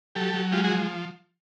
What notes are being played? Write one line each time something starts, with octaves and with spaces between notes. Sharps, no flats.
F#3 G4 A4
F#3
G#3 F4 G4
F#4 G#4
F3